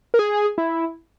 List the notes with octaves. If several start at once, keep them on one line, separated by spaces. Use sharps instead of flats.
A#4
G#4
E4